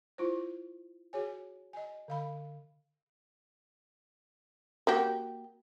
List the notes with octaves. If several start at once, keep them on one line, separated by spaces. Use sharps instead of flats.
E4 F4 C5
F#4 G#4 C#5 G#5
D#5 G#5
D3 F5 B5
A#3 F#4 G4